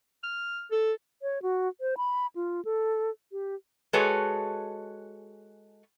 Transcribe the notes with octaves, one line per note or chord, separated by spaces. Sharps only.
F6
A4
C#5
F#4
C5
B5
F4
A4
G4
G#3 F#4 G#4 A4 B4 C#5